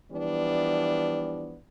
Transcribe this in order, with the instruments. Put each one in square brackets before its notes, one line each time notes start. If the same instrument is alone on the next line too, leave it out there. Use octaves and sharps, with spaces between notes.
[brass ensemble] E3 F3 G3 B3 D4